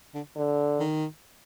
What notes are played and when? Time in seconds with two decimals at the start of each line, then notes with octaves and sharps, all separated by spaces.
0.14 D3
0.36 D3
0.80 D#3